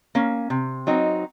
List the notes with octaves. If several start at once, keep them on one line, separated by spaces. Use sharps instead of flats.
A#3 C#4
C3
F#3 C4 D#4